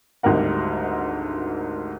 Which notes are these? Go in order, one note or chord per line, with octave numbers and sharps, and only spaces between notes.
G#1 D2 G#2 G3 A#4 F#5